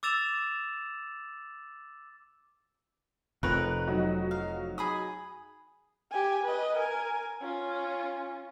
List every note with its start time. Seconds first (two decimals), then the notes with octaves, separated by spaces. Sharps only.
0.03 D6 E6 A6 E7 F7
3.43 F1 F2 A#4 B4 C#5 F#6 F7
3.88 F#3 D#4 F#4
4.31 F5
4.78 G#4 B5 D#6
6.11 G4 G#5
6.43 B4 D#5
6.76 A#4 G#5
7.41 C#4 F4